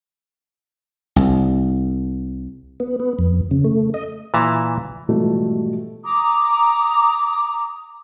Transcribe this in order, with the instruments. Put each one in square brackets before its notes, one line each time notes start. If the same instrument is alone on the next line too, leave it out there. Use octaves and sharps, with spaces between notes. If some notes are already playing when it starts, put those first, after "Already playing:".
[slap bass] C2
[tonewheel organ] B3
B3
F2
C#3
A3
D#5
[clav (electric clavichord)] A#2 E3 E5 A5 A#5
[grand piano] G#2 B2 E3 F3 G3 A3
[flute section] A#5 D6 D#6